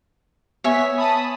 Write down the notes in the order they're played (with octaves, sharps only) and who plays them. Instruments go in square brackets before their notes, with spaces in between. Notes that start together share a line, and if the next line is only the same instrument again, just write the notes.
[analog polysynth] B3 B6 [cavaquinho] C#5 E5 G#5
[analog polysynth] A5 B5 D#6